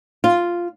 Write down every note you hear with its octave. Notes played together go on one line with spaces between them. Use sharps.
F4